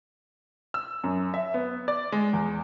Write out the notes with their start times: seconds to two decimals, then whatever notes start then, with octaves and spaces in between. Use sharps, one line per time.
0.74 E6
1.04 F#2
1.34 E5
1.54 B3
1.88 D5
2.12 G#3
2.33 E2